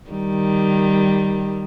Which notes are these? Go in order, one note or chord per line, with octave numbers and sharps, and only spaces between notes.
D#3 G3